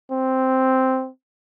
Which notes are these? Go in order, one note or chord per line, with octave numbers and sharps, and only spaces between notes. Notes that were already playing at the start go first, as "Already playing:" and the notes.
C4